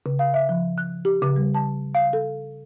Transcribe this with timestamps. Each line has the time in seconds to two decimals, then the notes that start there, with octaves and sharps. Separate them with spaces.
0.06 C#3
0.19 F5
0.34 E5
0.49 F3
0.78 F#6
1.05 G4
1.22 C#3
1.36 G3
1.54 A5
1.95 F5
2.13 A4